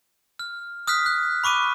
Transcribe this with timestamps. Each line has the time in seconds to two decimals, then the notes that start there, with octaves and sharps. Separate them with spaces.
0.39 F6
0.87 D#6 F6 F#6 B6
1.06 F#6
1.44 B5 C#6 D6 D#7